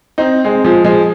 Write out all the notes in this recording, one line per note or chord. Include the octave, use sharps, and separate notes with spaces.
C4 D#4
G#3 C4
F3 G#3
F3 G#3